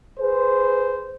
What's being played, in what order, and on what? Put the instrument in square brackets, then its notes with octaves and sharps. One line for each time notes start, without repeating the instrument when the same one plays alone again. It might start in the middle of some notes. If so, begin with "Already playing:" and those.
[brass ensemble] G#4 B4 C5